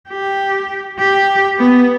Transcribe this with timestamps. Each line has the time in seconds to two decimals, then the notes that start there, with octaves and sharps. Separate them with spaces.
0.09 G4
0.99 G4
1.58 B3